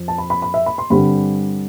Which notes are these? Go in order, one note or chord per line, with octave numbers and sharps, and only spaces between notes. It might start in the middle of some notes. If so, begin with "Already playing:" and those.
Already playing: F2
A5
B5
B5
B5
E5
B5
C6
G2 D3 G3 C4 B5